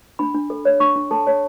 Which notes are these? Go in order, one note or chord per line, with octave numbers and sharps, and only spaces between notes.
D4 B5
D4
A4
C#5
D4 C#6
D4
A4 A5
C#5